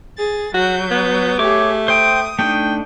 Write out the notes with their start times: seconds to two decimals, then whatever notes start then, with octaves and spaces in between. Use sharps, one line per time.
0.16 G#4 A6
0.54 F#3 F#4 G6
0.91 B3
1.39 A3 G4 G#4 C#5 D6
1.88 C5 G5 D#6
2.39 A3 D4 D#4 G5